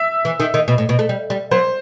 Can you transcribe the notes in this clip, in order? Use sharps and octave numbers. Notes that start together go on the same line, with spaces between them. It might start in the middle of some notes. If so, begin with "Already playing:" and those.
Already playing: E5
E3
D#3
D#3
B2
A2
B2
A3
G3
G3
F#3 C5